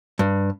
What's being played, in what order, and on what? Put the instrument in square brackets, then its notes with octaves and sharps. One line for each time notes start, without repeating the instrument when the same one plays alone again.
[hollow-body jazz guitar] G2